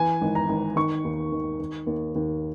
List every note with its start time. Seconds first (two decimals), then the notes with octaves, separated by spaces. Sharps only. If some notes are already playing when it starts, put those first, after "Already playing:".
Already playing: E3 G#5
0.21 G#1
0.35 A#5
0.49 G#1
0.76 D#3 C#6
1.04 D#2
1.32 D#3
1.59 D#3
1.87 D#2
2.15 D#2